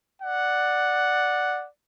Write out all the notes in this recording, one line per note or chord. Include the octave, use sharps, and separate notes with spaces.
D5 F#5